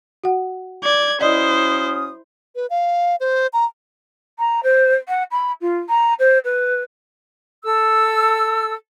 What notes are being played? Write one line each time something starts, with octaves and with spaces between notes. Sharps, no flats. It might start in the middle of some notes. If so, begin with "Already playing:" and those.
F#4 F#5
D5 G#6
F#3 C#4 E4 C5 D5 D#5 D#6
B4
F5
C5
A#5
A#5
C5
F#5
B5
F4
A#5
C5
B4
A4 E6